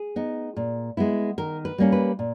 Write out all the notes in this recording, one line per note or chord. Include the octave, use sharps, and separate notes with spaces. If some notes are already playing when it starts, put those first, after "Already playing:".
Already playing: G#4
B3 D#4
A#2
G#3 B3 E4
D#3 A#4
B4
G3 A#3 C#4
B4
A#2